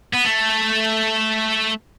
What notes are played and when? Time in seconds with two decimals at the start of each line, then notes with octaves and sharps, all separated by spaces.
0.13 B3
0.25 A3